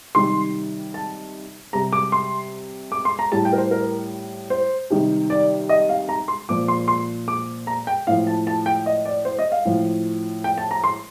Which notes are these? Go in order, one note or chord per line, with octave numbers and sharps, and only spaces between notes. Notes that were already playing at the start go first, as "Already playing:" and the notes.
C3 D#3 G3 C6
A5
C3 G3 A#5
D6
C6
D6
C6
A#5
A2 G3 A5
G5
A#4
C5
A#4
C5
C3 D#3 G3
D5
D#5
F5
A#5
C6
A#2 F3 D6
C6
C6
D6
A#5
G5
A2 F3 F5
A5
A5
G5
D#5
D5
C5
D#5
F5
A2 F3
G5
A5
A#5
C6